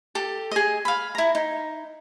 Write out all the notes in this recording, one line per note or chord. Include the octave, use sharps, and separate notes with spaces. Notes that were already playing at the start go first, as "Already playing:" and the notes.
G4 A4
G#4 D#5
F5 B5
E4 A#5
D#4